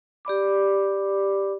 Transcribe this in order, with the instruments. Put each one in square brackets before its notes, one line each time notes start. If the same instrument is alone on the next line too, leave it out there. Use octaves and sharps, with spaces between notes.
[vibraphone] G4 D5 B5 D6